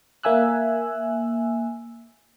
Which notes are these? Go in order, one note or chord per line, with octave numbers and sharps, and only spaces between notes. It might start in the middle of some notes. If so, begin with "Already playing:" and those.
A#3 E5 G#5 E6 F#6